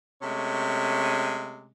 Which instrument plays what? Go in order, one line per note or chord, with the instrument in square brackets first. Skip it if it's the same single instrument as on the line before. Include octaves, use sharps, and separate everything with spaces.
[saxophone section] C3 G#3 A3 C#4